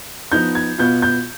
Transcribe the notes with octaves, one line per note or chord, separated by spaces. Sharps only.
F3 B3 D#4 G6
G#6
B2 B3 F4 G6
G6